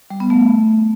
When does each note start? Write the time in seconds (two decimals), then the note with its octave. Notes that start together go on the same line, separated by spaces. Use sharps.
0.10 G3
0.20 B3
0.30 A3